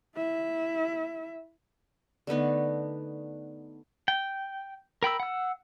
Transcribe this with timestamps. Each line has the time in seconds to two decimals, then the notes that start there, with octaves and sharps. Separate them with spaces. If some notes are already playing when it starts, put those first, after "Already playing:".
0.17 E4 E5
2.27 D3 A3 B3 D#4
4.08 G5
5.03 A#4 G5 B5 E6
5.20 F#5 E6